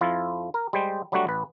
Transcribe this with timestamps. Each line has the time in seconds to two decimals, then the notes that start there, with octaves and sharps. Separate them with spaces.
0.01 F2 F3 E4 F4
0.54 A#4
0.73 G3 G#3 C5 G5
1.12 F#3 G3 A3 D4 F#4
1.27 A1 B4